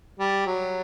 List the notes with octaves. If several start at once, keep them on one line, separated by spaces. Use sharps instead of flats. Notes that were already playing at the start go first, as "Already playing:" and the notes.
G3
F#3